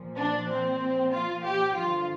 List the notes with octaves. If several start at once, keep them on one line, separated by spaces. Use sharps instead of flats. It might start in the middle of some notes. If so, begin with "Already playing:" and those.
Already playing: A#2 F3
D4
C4
F4
G4
G2 D3 F3 F4